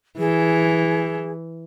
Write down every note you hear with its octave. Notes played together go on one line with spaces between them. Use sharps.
E3 G#4